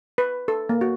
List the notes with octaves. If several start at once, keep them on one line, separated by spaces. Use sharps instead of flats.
B4
A4
A#3
F#4